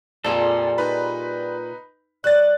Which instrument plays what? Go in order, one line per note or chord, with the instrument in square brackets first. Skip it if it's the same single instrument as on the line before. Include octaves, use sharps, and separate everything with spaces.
[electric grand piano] F2 [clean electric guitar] A#2 A4 [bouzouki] G3 F4 G#4
[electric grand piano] D#4 B4 B5
[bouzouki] F#3 B3 [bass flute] D5 [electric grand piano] F#6 A6